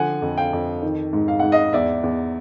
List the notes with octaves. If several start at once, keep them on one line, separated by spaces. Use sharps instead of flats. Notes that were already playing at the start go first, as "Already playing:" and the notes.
Already playing: D3 F3 F#5 G#5
F2
F5 G5
F2
D#3
G#2
F5
G#2 F#5
D#5 F5
E2 D5 E5
E2